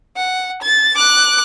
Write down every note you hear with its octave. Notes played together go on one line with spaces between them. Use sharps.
F#5
A6
D6 F#6